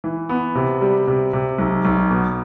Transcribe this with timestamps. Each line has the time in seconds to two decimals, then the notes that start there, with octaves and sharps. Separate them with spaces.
0.04 E3
0.29 B3
0.55 C3
0.81 G3
1.07 C3
1.33 C3
1.58 B1
1.85 B1
2.11 B2